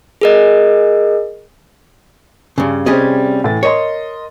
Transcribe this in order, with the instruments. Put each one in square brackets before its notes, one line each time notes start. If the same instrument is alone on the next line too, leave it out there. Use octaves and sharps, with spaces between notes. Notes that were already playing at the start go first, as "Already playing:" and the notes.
[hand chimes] G#4 A#4 D#5
[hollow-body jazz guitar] G2 C#3
[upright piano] C3 C#4 C5 [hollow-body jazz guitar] G3 G#4 D#5
[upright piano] A2 E3 A6
[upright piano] A#4 D#5 C6 [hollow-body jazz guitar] C#5